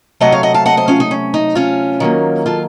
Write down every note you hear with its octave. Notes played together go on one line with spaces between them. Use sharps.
C3 F#3 A3 D#5 F#5
C#5 F5
D#5 F#5
F5 A5
D#5 F#5
C5 D#5
C#4 F4
D#4
C#4
D#4
C#4 F4
D#3 F#3 A#3
F4 A4